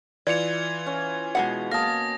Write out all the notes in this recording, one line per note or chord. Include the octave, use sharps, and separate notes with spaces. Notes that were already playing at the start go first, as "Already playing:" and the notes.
E3 F4 D5 G#6 C#7 F7
C#4
B2 G#3 G#4 F#5
A#3 F5 A5 D#6 A#6